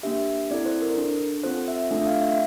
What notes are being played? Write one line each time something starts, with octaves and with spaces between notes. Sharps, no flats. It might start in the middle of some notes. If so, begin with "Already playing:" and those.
A#3 D4 G4 E5
C4 E4 A4 D5
C5
A#4
D4 A4
C4 F4 A4 C5
E5
A3 D4 F4 A4 E5
F5
E5